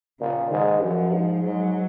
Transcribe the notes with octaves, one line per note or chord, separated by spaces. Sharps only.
A#2 C#3
G#2 D#3
F#2 F3
G#2
G#2 F#3